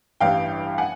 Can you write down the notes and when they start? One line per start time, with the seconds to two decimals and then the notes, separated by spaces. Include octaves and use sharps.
0.20 A1 G2 E3 G3 F5 G5
0.78 F#5 G#5